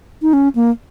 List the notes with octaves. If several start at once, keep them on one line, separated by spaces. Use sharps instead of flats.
D#4
C#4
A#3